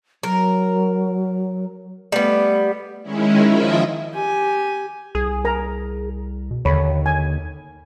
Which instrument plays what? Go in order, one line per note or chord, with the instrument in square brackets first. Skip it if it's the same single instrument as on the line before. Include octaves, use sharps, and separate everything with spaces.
[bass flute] F#3 [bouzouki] A#4
[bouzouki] G3 B3 [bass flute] A3
[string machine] D#3 G#3 C#4 E4
D#3 F3 E4 F4 D#5 E5
[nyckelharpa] G4 G#5
[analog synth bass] C2 [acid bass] G#4
[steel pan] A#4 A#5
[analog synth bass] B2
[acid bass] D#2 [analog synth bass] D3 [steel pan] C#5 B5
[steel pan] G#5